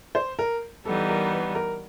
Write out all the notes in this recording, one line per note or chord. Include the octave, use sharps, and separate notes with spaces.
C5
A#4
E3 G3 B3 D#4 A4
A#4
B4
A#4